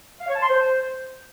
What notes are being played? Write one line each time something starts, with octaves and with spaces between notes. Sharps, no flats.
F5
C#5
A5
C6
C5